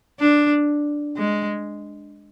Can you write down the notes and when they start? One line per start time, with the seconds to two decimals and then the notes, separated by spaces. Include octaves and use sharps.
0.20 D4
1.17 G#3